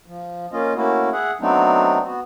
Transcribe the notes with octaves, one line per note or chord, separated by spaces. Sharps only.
F3
A#3 C#4 F4 D#5
A3 A#3 C#4 E4 F#4
G#4 E5 F#5
F#3 A3 B3 C4 D4 D#4
B3 F#4